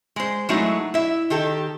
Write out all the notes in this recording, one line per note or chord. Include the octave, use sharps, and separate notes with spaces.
G#3 C5
F#3 G#3 A3 D#4 E4 F#4
E4 E5
D#3 G4 A4